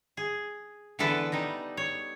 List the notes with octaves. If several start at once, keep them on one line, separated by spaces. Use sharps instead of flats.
G#4
D3 E3 B3 A4 B4
G3 D#4 D#5
C#5